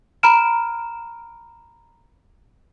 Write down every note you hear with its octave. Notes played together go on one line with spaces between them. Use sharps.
A#5 B5 F6 D7 E7